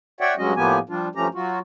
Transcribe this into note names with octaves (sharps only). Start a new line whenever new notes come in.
F#4 C#5 D5 E5 F#5 G5
G2 F#3 G#3 C#4 F#4 D#5
A2 F3 A#3 B3 G4 G#5
F3 G3 D4 F4
G2 F3 A3 C#4 G4 A#5
F#3 F4 F#4